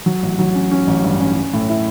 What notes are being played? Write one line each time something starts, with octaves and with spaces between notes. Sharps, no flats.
F#3
A1
F#3
C#4
C#4
A1
G2
C#4
C#4
A2
E4